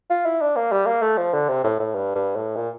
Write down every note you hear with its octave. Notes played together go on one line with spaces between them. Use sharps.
F4
E4
D4
A#3
G3
A#3
A3
F3
D3
C3
A2
A2
G2
G2
A2
A#2